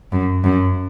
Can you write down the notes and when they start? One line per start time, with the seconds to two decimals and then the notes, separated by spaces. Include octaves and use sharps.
0.12 F#2
0.44 F#2